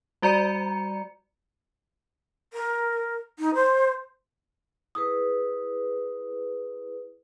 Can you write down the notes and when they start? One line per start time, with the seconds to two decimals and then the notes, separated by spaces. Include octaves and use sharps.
0.22 G3 F#4 D5 A#5 C#7
2.53 A#4
3.39 D#4
3.55 C5
4.95 E4 G#4 B4 D#6